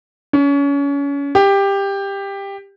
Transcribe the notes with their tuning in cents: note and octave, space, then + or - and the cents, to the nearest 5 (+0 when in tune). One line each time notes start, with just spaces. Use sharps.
C#4 +30
G4 +15